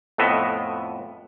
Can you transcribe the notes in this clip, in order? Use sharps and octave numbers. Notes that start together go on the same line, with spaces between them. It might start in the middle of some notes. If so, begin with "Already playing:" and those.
F2 A2 B3 D#5 E5